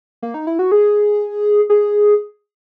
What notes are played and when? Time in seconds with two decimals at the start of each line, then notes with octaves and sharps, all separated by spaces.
0.22 A#3
0.34 D#4
0.47 E4
0.59 F#4
0.72 G#4
1.70 G#4